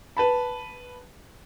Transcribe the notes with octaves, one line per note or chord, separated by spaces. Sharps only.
B4 A5 B5